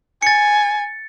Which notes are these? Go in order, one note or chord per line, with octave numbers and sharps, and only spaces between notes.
G#5 A6 C#7